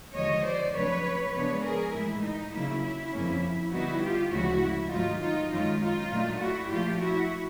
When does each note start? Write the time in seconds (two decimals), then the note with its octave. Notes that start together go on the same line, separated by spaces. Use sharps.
0.14 D#2 D3 F3 G#3 C#5 D#5
0.45 C5 D5
0.74 F2 C#3 F#3 A3 D4 B4 C#5
1.34 C#3 F3 G#3 B3 D4 B4 C#5
1.64 G#4 A#4
1.93 A2 E3 G#3 E4
2.23 D#4
2.53 C#3 F#3 A#3 E4
2.83 E4
3.13 F2 C#3 F3 A#3 C#4
3.72 D3 G3 B3 D#4 E4 F#4
4.02 F4 G4
4.32 D2 C#3 F3 G#3 E4 F#4
4.62 E4
4.91 G#2 D#3 F#3 A3 D#4 F4
5.22 D#4 F4
5.51 F#2 D#3 G#3 C#4 D#4 F4
5.81 D#4 F4
6.11 A#2 F#3 A3 D4
6.41 E4 F#4
6.70 A#2 F3 A3 F4 G4
6.99 E4 F#4